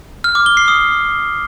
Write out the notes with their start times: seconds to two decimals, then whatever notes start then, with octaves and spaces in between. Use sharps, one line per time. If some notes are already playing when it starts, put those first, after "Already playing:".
0.24 F6
0.35 D6
0.46 G7
0.57 C7
0.68 D#6